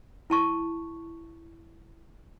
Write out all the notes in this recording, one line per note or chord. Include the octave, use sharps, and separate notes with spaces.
E4 A5 C#6